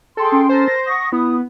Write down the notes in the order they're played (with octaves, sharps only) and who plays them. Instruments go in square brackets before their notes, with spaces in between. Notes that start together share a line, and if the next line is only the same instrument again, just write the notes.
[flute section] G#4 G5 C6 [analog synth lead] A4
[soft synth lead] C#4
[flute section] A4 A#4 [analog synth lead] C5
[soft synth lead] A#6
[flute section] F#5 C#6 D#6 [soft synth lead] A#6
[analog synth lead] B3 [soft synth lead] E4 [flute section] D#6